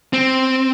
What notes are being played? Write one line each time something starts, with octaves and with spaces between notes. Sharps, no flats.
C4